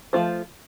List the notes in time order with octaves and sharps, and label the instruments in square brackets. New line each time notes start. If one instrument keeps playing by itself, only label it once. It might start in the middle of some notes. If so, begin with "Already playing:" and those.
[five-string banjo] F3 A3 F4 C5